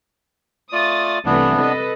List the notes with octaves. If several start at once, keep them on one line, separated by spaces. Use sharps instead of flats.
A3 F4 D5 D#6 A6
C2 E3 A3 B3 D4
A4 B4 D#5